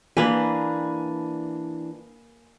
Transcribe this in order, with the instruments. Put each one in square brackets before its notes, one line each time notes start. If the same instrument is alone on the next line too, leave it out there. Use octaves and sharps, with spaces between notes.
[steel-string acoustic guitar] E3 D4 [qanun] A#3 B4 [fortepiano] G#4 G#5